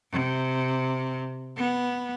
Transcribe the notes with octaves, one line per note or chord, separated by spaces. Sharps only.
C3
B3